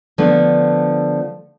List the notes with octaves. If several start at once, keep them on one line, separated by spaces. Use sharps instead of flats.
D3 F3 A3 B3 D4